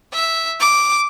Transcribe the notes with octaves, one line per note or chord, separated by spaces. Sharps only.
E5
D6